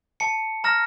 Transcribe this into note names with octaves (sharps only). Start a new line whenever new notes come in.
A5 C#7
A#5 F6 A#6